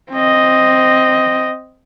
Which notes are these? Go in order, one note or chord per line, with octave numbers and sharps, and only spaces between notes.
C4 D#5